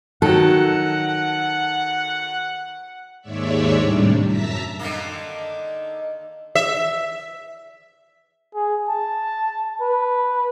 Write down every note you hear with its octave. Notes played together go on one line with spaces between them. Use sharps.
D#3 F#3 A4 F#5
D#2 G#2 G#3 C#5 D5 E5
A2 C3 G3 D4
F#2 E5 A5 A#5 B6
D3 D#3 A#3
E5
G#4
A5
B4